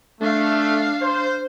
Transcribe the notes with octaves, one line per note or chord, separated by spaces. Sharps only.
A3 D4 F5
C5